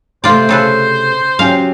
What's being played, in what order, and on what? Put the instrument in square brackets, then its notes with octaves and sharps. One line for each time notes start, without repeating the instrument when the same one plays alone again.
[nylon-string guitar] C3 A3 [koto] F4 D5 [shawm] C5
[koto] C#3 A4 B4
[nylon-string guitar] F#3 C#4 G4 [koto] F5